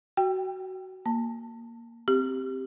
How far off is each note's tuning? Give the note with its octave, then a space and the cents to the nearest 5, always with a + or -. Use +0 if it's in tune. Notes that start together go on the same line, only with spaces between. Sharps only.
F#4 +15 G5 +0
A#3 +0 A5 +25
C4 +0 G4 +0